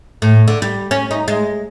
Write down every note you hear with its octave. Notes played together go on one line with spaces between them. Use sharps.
A2
D3
G3
C#4
D#4
G#3